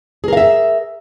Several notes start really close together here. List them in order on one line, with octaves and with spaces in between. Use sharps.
G#4 A#4 F5 E5